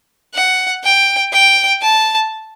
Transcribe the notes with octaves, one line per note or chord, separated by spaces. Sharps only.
F#5
G5
G5
A5